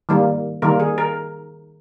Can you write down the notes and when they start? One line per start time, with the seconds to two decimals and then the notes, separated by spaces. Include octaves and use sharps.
0.09 D#3 G3 A#3
0.62 D#3 G3 A#3 A#4
0.80 G#4
0.98 A#4